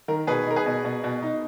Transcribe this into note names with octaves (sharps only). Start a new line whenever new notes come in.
D#3 A#4
B2 G#4 B4
D#4 A#4
G#4 B4
B2
B2
B2
D#4